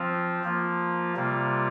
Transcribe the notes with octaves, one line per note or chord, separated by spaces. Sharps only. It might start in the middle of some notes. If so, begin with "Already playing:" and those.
Already playing: F3 C4 F4
F3 A#3 F4
C3 G3 A#3 F4